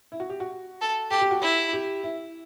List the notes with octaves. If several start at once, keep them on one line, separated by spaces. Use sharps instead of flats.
E4
F#4
G4
F#4
A4
G4 A4
G4
F#4
E4 G4
G4
E4